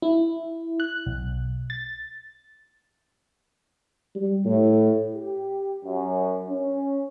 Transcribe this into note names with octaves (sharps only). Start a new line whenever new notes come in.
E4
F#6
B1
A6
G3
A2
G4
F#2
C#4